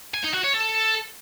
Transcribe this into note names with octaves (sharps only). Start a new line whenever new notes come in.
G#5
D#4
F#4
C#5
A4